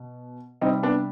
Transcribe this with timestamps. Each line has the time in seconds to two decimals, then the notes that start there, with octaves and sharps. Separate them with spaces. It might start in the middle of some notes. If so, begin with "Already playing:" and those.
Already playing: B2
0.61 C3 G3 C4 D#4
0.83 B3 D4